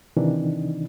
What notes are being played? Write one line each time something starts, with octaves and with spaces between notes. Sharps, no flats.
C3 D#3 E3 D4 D#4